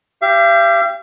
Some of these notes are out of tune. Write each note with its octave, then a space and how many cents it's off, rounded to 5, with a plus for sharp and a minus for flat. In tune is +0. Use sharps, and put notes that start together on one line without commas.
G4 +0 F5 -45